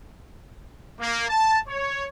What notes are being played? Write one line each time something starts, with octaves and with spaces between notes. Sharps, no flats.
A#3
A5
C#5